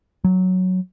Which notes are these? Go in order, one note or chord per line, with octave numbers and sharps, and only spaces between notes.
F#3